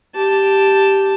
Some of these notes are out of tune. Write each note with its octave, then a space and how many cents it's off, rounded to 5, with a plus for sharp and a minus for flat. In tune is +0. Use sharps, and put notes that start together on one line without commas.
G4 +0 A5 +0